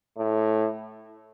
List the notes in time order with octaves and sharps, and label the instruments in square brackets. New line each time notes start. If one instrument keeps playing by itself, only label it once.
[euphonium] A2